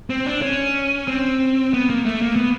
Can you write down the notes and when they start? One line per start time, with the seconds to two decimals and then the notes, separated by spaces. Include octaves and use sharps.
0.10 C4
0.26 D4
0.42 C#4
1.08 C4
1.74 B3
1.90 A#3
2.06 A3
2.22 A#3
2.36 B3